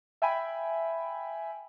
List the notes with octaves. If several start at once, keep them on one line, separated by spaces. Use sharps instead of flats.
E5 G5 G#5 B5